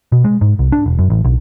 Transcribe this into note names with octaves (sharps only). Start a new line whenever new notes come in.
B2
G#3
G#2
C2
D4
E1
F#2
A1
B1